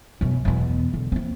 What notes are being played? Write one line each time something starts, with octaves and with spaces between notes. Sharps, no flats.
F#2 B2
E2 B2
D3
A#3 C4